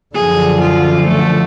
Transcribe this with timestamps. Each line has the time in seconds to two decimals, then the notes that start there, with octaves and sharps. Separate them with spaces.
0.15 F#2 D3 F3 G#4
0.62 F4
1.07 A3